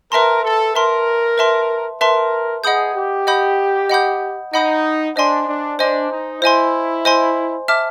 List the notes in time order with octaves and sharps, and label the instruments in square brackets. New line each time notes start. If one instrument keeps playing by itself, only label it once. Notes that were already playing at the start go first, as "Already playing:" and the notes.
[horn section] A#4 [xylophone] B4 E5 A5 C6
[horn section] A4
[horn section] A#4 [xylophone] B4 E5 A5 C6
[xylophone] B4 E5 A5 C6
[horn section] A#4 [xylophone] B4 E5 A5 C6
[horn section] G#4 [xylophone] D#5 F#5 B5 D#6 G6
[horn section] G4
[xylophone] D#5 F#5 B5 D#6 G6
D#5 F#5 B5 D#6 G6
[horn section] D#4 [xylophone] D#5 F#5 B5 D#6 G6
[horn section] D4 [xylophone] C5 D#5 G#5 C6
[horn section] D4
[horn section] D4 [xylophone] C5 D#5 G#5 C6
[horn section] D#4
[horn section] E4 [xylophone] C5 D#5 G#5 C6
[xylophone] C5 D#5 G#5 C6
E5 A5 D6 F6